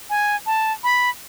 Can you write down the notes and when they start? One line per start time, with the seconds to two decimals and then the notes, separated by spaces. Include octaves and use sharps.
0.10 G#5
0.46 A5
0.84 B5